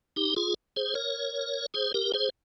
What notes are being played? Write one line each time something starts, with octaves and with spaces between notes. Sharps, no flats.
D#4 G4
F4 G#4
G#4 C5
A#4 C#5
G#4 C5
G4 A#4
G#4 C5